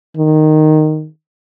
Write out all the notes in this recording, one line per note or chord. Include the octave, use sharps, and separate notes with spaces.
D#3